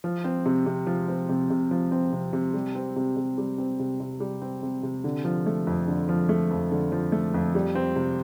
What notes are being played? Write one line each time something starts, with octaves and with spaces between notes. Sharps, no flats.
F3
C4
C3
C3
F3
C4
C3
C3
F3
C4
C3
C3
G3
C4
C3
C3
G3
C4
C3
C3
G3
C4
C3
C3
D3
F3
A3
F2
D3
F3
A3
F2
D3
F3
A3
F2
G3
C4
C3